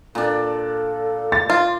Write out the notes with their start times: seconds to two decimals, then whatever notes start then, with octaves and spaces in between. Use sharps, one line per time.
0.15 A#2 D4 A4
1.32 A6
1.50 F4 C6